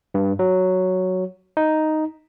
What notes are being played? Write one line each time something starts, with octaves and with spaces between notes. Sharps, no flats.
G2
F#3
D#4